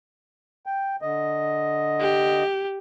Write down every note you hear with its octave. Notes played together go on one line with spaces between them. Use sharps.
G5
D3 D#5
G4